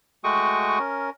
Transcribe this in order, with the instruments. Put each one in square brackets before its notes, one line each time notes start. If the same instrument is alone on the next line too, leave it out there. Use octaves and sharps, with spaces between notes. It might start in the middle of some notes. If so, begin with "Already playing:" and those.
[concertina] G#3 A3 F#4 G5 C#6 D#6
C#4 A#4